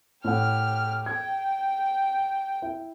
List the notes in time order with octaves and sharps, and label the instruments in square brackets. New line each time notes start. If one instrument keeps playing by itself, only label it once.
[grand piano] A2 C#5 F#5 [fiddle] G4 F6
[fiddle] G5 [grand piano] G#6
[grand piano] E4